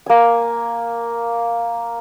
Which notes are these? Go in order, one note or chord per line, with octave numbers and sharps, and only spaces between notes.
A#3 G#5